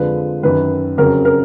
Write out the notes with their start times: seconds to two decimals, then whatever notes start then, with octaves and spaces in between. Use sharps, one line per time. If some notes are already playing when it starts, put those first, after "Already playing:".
Already playing: F2 D3 F3 G#3 B4
0.43 F#2 D#3 F#3 B4
0.98 F2 C#3 F#3 A#4
1.25 A#4